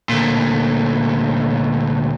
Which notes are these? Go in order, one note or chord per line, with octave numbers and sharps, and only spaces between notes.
D2 A#2